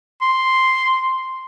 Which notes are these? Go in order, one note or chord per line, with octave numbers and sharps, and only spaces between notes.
C6